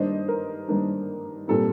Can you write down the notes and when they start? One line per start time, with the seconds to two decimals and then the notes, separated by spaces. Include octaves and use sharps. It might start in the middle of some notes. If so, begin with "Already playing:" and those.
Already playing: G2 D#3 A#3 D4 C5 D#5
0.28 A#4
0.68 G2 D#3 A#3 D4
1.48 A#2 G3 C4 A4